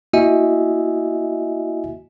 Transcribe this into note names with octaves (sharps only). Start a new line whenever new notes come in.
A#3 E4 F#4 D#5 E5 G#5